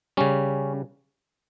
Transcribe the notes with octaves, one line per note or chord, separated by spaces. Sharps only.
C#3 G3 C#4